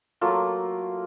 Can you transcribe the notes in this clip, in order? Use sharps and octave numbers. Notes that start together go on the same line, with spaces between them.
F#3 A3 A#3 F4